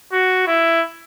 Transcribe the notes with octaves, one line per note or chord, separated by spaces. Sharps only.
F#4
E4